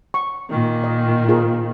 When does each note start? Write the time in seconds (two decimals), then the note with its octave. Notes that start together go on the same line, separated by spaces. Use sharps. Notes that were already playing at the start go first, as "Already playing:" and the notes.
0.14 C#6
0.49 A#2 D#3
0.84 D#5
1.29 F4 G#4 A#4